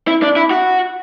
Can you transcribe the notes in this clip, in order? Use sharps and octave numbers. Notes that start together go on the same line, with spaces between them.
E4
D4
E4
F#4